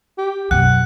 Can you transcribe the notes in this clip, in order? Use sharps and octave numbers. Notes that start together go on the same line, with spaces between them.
G4
F#2 B2 F#5 F#6